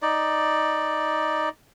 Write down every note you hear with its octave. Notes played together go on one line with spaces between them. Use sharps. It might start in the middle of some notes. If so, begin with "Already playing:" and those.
D#4 D5